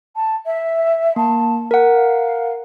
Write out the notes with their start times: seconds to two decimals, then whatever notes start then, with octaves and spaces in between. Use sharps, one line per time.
0.16 A5
0.46 E5
1.16 A#3 A5
1.71 A#4 F#5
1.95 F5